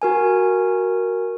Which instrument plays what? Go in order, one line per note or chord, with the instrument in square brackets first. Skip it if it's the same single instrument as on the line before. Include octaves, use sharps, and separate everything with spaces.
[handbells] F#4 A#4 G#5